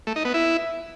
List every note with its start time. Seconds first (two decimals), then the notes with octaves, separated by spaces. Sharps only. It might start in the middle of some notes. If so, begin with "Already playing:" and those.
0.07 A3
0.16 D#4
0.25 B3
0.34 E4